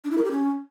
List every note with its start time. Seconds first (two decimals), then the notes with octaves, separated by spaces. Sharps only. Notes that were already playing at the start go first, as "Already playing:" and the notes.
0.04 D4
0.11 E4
0.18 A#4
0.24 G4
0.31 C#4